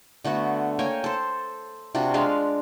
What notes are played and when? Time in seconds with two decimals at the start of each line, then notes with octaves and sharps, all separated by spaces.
0.24 D3 A3 B3 F#4
0.79 A#3 C#5 G5 G#5
1.04 A4 C5
1.95 C3 D4 F4 F#4
2.14 G#3 D4 F5